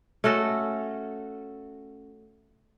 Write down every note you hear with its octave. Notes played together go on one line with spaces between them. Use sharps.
A3 C#4 F#4 A4